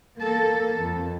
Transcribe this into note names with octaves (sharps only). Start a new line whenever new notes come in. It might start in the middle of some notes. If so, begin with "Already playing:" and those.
A#3 A4
F2